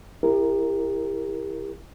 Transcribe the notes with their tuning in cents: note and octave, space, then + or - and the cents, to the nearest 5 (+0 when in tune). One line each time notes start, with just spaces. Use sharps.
E4 +10 G4 +30 A#4 +0